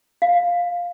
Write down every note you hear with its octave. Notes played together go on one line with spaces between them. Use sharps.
F5